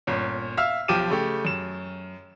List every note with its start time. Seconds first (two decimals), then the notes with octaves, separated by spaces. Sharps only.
0.07 G1 A#2 C#4
0.57 E5 F5 E6 F6
0.88 B1 F3 G4 D6 D#7 E7
1.10 C#3 A3 G4
1.45 F#2 E7